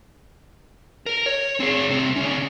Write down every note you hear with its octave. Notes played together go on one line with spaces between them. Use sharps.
A#4
C#5
C4 G#4
C2 C4
D3 C#4